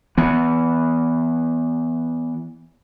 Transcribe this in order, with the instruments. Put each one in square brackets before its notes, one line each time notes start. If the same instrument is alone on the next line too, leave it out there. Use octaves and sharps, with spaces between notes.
[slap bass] E3 B3